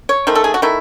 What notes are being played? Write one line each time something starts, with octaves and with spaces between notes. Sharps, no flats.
C#5
D#3 A3 C5
A4
G#4
F#4
D#3 A3 E4